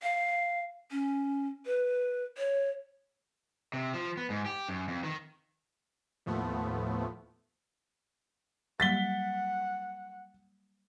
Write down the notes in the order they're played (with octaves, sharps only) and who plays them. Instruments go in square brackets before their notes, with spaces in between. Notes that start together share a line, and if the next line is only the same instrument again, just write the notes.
[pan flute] F5
C#4
B4
C#5
[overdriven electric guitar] C3
F3
B3
G#2
G4
F#2
F2
D#3
[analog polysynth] D#2 A2 F3 A3 B3
[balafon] F#3 G3 A#3 [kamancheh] F#5 [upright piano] A6 B6 G7